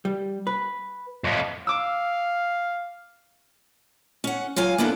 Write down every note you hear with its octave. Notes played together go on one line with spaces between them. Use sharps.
G3
B4
F2 A2
F5 D6 E6
C#4 F#5
F#3 F4 F5 G#5
A#3 B3 D4 E4 A4